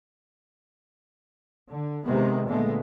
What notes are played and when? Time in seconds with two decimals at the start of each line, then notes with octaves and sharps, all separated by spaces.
1.70 D3
2.04 C3 D#3 G#3 B3
2.48 A#2 D3 G#3 A3 B3